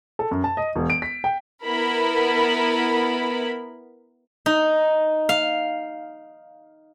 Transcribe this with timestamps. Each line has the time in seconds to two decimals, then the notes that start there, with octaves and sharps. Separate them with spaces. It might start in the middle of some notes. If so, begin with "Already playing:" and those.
0.19 A4
0.31 F#2
0.44 A5
0.57 D#5
0.75 E1
0.90 D7
1.02 B6
1.24 G5
1.65 B3 E4 A#4 B5
4.46 D#4
5.29 F5